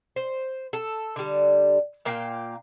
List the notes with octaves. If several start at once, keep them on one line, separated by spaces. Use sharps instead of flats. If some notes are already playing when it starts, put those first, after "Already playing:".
C5
A4
D3 G3
A#2 A#3 F5 G5